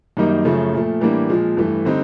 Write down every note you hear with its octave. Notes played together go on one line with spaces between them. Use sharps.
F#2 D#3 G3 A#3 D#4
F#2 C#3 F3 A3
A#2 F3 A3
A2 E3 G3 A#3 D4
A#2 F3 G#3
G2 E3 A3
D3 G3 C4 D#4